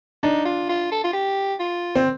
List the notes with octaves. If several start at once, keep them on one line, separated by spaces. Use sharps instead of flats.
D4 D#4
F4
F4
A4
F4
G4
F4
C4